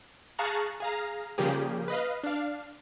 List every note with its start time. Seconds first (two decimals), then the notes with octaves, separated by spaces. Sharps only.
0.39 G#4 F5 A5 A#5 C#6 F#6
0.80 G#4 F5 A#5
1.38 C#3 F3 G3 A#3 G4 G#4
1.88 B4 D#5 F5
2.23 D4 F5